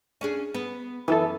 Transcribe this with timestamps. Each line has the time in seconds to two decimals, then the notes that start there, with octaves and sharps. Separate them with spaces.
0.21 C#4 D4 G#4
0.54 B3
1.08 F#2 E3 B3 E4 A4